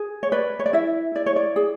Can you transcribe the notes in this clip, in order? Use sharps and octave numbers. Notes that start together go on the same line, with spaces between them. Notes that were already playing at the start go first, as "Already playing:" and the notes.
Already playing: G#4
C#5
B4 D5
C#5
D5
E4 E5
E4 D5
C#5
D5
G#4